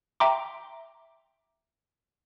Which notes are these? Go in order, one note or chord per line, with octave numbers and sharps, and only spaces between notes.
E5 G5 A#5 C6 D6